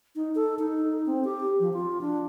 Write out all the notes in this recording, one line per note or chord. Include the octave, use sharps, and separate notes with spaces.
D#4
A4
D#4
C4
G4
F3
F4
D4